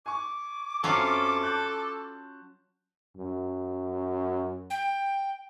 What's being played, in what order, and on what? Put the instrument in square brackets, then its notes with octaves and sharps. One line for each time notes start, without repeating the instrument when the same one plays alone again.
[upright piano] G#5 C#6 [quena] D6
[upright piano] F#2 C4 [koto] F#3 C#4 F4 [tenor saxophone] A4
[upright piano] A5 F#6 G6
[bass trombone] F#2
[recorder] G5